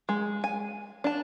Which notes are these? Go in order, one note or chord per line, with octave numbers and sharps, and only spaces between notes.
G#3
G#5
D4 A5